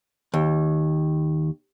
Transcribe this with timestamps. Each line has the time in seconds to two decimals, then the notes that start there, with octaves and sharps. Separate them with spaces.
0.34 D#2